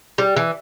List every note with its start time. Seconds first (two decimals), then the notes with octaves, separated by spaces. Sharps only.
0.18 G3
0.36 E3